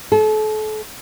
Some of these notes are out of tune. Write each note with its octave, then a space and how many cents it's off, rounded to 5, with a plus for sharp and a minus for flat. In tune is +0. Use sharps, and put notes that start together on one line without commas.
A4 -35